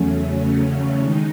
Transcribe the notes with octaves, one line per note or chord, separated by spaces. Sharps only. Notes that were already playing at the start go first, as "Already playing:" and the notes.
Already playing: E2 C#3 F#3 A3 C#4
D#3 G#3 D#4